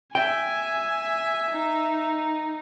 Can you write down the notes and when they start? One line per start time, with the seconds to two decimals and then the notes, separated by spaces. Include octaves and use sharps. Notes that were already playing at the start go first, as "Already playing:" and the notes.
0.15 E5 G5 G#5
1.51 D#4